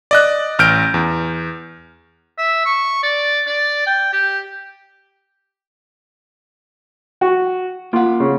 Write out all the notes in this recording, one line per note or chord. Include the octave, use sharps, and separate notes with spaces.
D5 D#5 F#6
A1 F6 G6 D7
E2
E5
C#6
D5
D5
G5
G4
F#4
A#3 F4 F#5
C#3